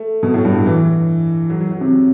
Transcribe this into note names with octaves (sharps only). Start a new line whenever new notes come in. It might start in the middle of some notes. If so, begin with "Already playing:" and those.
Already playing: A3
B2
A2
G2
F#3
E3
F#3
F#3
F#3
C3